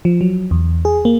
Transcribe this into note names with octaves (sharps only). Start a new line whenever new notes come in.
F3
F#3
E2
G#4
A#3